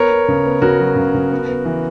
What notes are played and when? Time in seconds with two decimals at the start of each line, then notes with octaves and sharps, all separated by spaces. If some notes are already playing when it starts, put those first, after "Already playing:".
Already playing: B3 A#4 C#5
0.11 B3
0.28 C#3
0.46 B3
0.62 C#3 F#4 A#4
0.80 F#3
0.96 C#3
1.15 C#3
1.31 B3
1.48 B3
1.65 E3